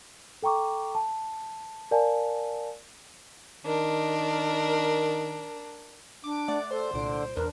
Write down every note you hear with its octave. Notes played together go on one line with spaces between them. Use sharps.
A4 G5 A#5 C#6 D6
A5
A#4 D5 F5 G#5 A5
D#3 D4 A#4
D4 D6
A3 D5 F#5
A4 C5
C2 A#2 D3 D7
E2 D4 A#4 B4